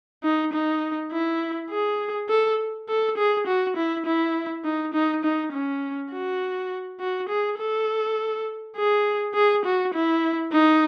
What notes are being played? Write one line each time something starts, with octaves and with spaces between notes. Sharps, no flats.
D#4
D#4
E4
G#4
A4
A4
G#4
F#4
E4
E4
D#4
D#4
D#4
C#4
F#4
F#4
G#4
A4
G#4
G#4
F#4
E4
D#4